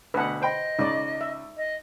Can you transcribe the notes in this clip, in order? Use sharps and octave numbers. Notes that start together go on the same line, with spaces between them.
D2 B2 B4 F#5
C5 D#5 G5 B5
C#2 D#4 D5
E5
D#5